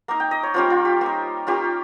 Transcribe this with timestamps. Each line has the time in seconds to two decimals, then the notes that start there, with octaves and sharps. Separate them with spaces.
0.08 A#3 D#4 A#5
0.20 G5
0.31 D#5
0.43 C#5
0.54 G3 A#3 C#4 F4 C5
0.70 F4
0.85 G4
1.01 A#3 D#4
1.47 A#3 C#4 F4 G4